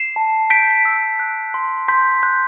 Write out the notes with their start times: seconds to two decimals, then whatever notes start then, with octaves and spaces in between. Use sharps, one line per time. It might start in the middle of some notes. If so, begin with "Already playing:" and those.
Already playing: C7 E7
0.16 A5
0.50 G6 B6 D7
0.85 E6
1.20 F#6
1.54 C6
1.88 C6 G6 B6
2.23 F#6 G6